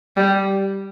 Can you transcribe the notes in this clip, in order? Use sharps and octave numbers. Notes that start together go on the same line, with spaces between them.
G3